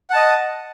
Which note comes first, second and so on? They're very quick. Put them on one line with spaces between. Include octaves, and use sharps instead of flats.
F#5 A5 D#5